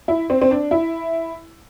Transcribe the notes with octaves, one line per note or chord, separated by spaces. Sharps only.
E4
C4
C4
D4
E4